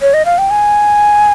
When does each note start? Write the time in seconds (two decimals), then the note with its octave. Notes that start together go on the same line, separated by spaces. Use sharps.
0.01 C#5
0.14 D#5
0.25 F5
0.38 G5
0.51 G#5